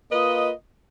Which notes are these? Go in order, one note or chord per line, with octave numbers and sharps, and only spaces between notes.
A#3 F4 B4 D#5